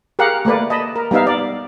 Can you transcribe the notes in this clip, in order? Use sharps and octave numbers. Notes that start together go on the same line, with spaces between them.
G4 G#4 A#4 F5 F#5
A3 A#3 B4 D5
D#5 A5 B5
A#4
G3 B3 D#4 E5 F5
D5